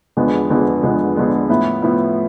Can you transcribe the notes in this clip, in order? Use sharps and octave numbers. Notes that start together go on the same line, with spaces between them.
E2 D3 F3 G#3 B3
E2 D3 F3 G#3 B3
E2 D3 F3 G#3 B3
E2 D3 F3 G#3 B3
A2 F3 B3 E4
A2 F3 B3 E4